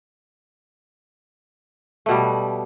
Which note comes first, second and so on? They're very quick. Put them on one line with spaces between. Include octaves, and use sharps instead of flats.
A3 B2 G3